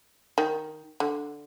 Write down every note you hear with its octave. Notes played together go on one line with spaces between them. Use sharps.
D#3
D3